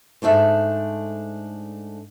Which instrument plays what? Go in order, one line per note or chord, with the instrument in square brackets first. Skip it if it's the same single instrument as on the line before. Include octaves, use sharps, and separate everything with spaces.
[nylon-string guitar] G#2 A3 D4 E5